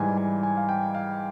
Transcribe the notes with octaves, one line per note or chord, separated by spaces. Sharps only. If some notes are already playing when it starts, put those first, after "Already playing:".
Already playing: G#2 E3 G3 G#5
G#5
G#5
F5
G5
F5